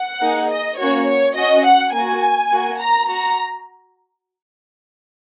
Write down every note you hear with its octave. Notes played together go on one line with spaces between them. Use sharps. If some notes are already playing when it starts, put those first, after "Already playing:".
Already playing: F#5
A#3 D#4 G#4
D#5
A#3 C#4 F#4 C#5
C#5
C#4 F#4 D#5
F#5
A#3 F#4 G#5
A#3 F#4
A#5
F#4 A#5